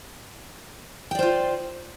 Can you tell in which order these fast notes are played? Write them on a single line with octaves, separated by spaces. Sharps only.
G5 D5 C5 F4